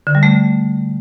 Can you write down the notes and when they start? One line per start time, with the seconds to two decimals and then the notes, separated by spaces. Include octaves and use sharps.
0.07 D3
0.15 G3
0.23 A3